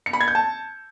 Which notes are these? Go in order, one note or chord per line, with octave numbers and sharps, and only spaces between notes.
C#7
B5
G#6
G6
A5